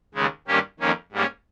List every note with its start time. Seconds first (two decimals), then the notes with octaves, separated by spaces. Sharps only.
0.14 D#2 C#3 G#3
0.47 G2 D#3 A#3 C#4 G4
0.80 F2 D#3 A#3 C#4
1.12 G#2 G3 A#3 C#4